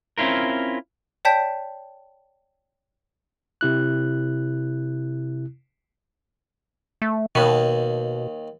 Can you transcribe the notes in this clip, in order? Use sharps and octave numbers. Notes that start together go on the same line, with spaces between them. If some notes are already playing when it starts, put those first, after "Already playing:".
C4 C#4 E4 F4 A#4
C#5 D5 G5 A5 G6 B6
C3 E4 F#6
A3
D#2 B2 D#3